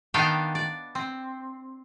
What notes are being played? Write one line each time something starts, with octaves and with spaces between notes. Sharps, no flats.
D#3 B3 D4 D#4 F5 G5
D5
C4